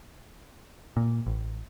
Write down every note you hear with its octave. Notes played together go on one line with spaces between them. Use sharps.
A#2
A1